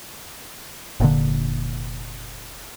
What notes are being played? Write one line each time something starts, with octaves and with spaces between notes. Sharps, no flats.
F1 A#2 D3